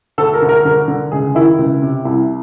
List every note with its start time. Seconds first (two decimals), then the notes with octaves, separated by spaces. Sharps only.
0.18 D2 A4
0.34 A#4
0.42 D2
0.49 A#4
0.65 D3 A#4
0.88 D3
1.12 C#2 G#4
1.35 D#3 E4
1.59 C#2
1.82 C3
2.05 C2 E4